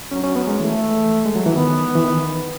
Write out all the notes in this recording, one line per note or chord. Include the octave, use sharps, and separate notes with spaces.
F#3 C#4
C#4
B3
G#3
E3 A3
G#3
F#3
E3
D#3 B3
E3
D#3